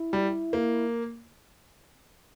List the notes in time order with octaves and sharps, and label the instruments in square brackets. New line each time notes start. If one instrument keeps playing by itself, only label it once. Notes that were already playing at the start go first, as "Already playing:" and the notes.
Already playing: [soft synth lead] E4
[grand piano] G3
A#3